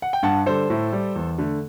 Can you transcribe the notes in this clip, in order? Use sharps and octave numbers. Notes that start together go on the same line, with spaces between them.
F#5
G5
G2 F#5 A5
D3 G3 A4 C5
A2
G3
E2
D3 A3